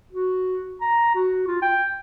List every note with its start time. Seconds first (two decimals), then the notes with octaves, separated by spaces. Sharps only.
0.12 F#4
0.81 A#5
1.15 F#4
1.47 F4
1.62 G5